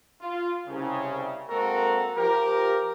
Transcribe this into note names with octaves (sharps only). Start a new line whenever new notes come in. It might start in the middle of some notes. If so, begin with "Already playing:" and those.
F4
C2 C#3
G#3 A#3 C4 F#4 A4 A#4
F3 G4 A#4